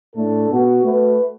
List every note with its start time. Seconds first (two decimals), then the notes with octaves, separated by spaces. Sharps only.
0.16 A2 A3 D4 A4
0.49 B2 B3 F#4
0.83 A3 F#4 B4